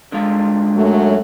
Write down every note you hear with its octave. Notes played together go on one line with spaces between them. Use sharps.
D3 G#3 F5
F#2 F#3 A3